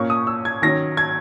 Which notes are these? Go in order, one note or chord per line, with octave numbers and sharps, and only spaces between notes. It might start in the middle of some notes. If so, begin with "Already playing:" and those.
Already playing: A#2 A#3 C#4 C#6
D#6
E6
G#6
D#3 F#3 C#4 A#6
G#6